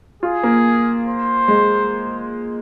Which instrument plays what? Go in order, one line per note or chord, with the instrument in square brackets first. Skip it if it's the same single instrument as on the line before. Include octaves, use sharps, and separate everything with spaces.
[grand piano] F4 [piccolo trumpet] G#4
[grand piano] A#3
[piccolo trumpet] C5
[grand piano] G#3